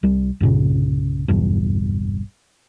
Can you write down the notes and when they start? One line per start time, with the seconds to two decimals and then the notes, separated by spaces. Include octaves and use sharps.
0.03 C2 G3
0.40 C2 G2 A#2 C#3
1.28 F#1 B1 E2 G2